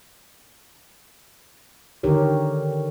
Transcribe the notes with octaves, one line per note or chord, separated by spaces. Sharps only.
D3 D#3 G4 A#4 C#5